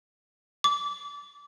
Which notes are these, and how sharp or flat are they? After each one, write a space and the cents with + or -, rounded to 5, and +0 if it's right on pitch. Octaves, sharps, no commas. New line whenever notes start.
D6 -25